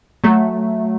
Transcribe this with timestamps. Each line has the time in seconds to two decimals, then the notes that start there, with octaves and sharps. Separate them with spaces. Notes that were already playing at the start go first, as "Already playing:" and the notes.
0.24 F#3 A3